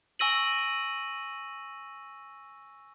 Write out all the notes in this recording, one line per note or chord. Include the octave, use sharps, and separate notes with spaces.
G#5 C#6 E6 A#6 D#7 F#7